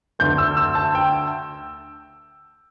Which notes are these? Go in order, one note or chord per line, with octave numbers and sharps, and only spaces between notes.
D2 D3 A3 G6
E6
E6
A5
G5